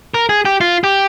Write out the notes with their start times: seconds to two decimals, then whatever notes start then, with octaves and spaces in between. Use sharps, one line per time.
0.14 A#4
0.29 G#4
0.45 G4
0.61 F4
0.84 G4